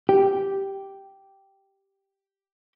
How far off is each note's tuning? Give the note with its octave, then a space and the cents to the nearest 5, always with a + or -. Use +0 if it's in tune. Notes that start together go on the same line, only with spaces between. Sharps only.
G4 -5